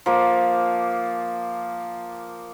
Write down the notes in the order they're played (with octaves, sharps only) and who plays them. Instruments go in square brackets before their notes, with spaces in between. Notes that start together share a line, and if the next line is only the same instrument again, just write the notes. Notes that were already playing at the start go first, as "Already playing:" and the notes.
[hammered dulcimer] F3 A#3